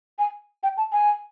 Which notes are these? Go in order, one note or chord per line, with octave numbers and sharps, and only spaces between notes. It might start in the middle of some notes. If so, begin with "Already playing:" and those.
G#5
G5
A5
G#5